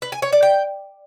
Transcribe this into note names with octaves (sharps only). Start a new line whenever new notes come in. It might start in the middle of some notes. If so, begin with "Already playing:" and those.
B4
G#5
C#5
D5
G5